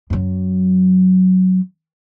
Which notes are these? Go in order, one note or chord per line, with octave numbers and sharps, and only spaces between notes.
F#2 F#3